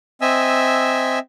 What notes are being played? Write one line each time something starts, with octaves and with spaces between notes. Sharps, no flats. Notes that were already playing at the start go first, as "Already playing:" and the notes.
C4 D#5 E5 G#5 E6